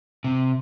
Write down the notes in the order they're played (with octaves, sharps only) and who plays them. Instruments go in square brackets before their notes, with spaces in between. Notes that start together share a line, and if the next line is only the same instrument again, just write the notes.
[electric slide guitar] C3